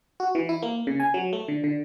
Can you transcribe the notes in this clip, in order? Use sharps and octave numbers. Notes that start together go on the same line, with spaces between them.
F#4
E3
E4
A#3
C#3
G#5
F#3
A3
D3
D3